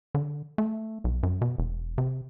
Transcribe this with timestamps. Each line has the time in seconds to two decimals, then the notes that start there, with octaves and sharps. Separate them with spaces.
0.15 D3
0.58 A3
1.04 B1
1.23 F#2
1.41 B2
1.58 E1
1.98 C3